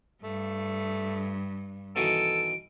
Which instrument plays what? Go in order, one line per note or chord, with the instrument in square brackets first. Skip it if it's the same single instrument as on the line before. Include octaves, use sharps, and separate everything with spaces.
[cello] G2 [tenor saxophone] A3
[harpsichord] B2 D#3 E3 [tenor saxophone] A4 [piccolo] D7